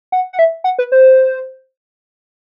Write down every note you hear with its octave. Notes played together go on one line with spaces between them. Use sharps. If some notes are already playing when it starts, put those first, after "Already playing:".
F#5
F#5
E5
F#5
B4
C5